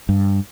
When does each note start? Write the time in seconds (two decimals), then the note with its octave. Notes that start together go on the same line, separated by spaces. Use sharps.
0.09 G2